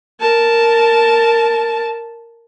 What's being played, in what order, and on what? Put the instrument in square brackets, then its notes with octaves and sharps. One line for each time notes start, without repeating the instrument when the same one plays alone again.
[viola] A#4 A5